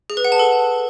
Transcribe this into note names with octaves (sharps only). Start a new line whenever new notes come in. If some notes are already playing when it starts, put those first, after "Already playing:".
G#4
B4
F#5
A5
A4